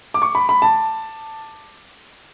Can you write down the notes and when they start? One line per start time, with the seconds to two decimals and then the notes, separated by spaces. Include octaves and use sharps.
0.14 D6
0.22 C#6
0.35 B5
0.49 B5
0.62 A5